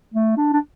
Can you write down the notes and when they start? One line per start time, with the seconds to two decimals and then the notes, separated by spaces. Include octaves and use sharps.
0.14 A3
0.37 D4
0.53 D4